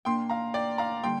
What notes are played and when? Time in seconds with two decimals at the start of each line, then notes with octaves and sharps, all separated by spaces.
0.05 A#2 A#3 D4 G5 C6
0.30 F5 A#5
0.54 D5 G5
0.78 F5 A#5
1.03 D3 G3 A#3 G5 C6